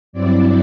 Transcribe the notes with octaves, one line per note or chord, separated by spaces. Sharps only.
G2 F#3 C4 E4 D5